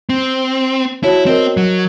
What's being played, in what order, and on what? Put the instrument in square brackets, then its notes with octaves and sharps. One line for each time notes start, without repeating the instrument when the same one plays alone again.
[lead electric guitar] C4
[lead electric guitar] E4 [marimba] F#4 C#5 A5
[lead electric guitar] C4 [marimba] A#4 D#5
[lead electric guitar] F#3